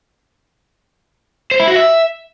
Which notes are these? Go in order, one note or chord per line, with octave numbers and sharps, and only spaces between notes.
C5
E4
F#4
E5